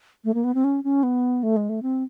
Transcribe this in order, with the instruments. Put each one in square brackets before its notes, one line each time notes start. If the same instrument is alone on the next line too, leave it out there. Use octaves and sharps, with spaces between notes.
[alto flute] A3
A#3
B3
C4
C#4
C#4
B3
A3
G#3
A3
C4